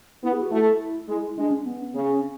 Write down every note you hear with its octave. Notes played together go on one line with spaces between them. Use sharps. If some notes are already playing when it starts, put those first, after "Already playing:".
B3 E4
G#4
F#4
A3 E4
G#3
G#3 D4
C#4
B3
C#3 C#4